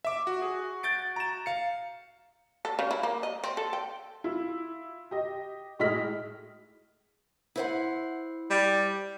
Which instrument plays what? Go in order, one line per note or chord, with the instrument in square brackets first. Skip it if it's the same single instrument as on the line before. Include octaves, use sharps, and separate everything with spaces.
[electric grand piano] E5 D6
F#4
[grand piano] G#4
G6 A6 D7
A#5 E7
[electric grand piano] F5 C#7
[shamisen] A4
C#3
E4
A#3
D#5
C4
A4
G5
[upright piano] E4 F4
G4 D#5
A2 G#3 E4 D#5 F6 B6
[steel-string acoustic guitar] E4 C5 F#5
[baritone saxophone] G3